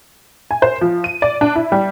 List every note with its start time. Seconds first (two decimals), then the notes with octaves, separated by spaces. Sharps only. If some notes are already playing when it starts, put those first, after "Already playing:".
0.51 G#5
0.62 C5
0.81 F3
1.04 D#7
1.22 D5
1.41 D4
1.56 E4
1.72 G3